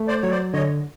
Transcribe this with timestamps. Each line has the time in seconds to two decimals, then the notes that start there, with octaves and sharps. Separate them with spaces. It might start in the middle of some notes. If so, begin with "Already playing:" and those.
Already playing: A3
0.08 C5 D5
0.21 F#3 C#5
0.31 C5 D5
0.53 D3 C#5 D#5